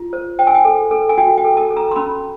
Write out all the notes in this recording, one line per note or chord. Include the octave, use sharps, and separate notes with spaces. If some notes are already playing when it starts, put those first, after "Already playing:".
Already playing: F4
C5
C5 G5
G#5
G5
A4
A4
G#5
F#4 G5
G5
A4
A5
A4
A#5
C6
C#4 B5